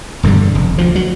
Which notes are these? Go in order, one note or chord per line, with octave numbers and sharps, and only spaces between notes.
E1 G2 D3 G3
F1
D2 F3
F#3